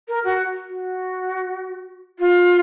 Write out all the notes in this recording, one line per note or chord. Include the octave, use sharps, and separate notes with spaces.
A#4
F#4
F#4
F4